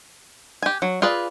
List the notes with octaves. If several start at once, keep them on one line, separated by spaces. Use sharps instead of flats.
G4 G#5
F#3
F4 G#4 B4 D5